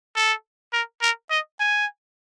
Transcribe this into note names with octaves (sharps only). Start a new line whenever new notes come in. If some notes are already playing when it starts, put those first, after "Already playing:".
A4
A#4
A#4
D#5
G#5